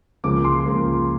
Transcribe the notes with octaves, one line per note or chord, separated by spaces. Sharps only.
C#2 C#3 F3 A#3 D6
C6
C#2 C#3 F3 A#3